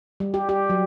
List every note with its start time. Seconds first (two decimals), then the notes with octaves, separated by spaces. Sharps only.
0.20 G3
0.34 G4
0.49 G4
0.70 F#3